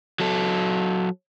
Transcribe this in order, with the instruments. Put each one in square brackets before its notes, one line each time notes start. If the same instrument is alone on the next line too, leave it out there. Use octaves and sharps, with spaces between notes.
[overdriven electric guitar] F#3 A4